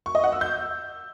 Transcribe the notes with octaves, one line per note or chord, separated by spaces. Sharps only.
C#6
D#5
F#5
E6
G6